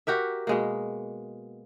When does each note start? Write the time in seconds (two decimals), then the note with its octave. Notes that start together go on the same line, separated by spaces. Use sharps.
0.07 F#4 G4 A#4 E5
0.47 B2 G#3 A#3